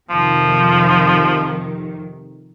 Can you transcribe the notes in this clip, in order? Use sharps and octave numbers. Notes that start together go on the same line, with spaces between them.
F2 C3 D#3 F3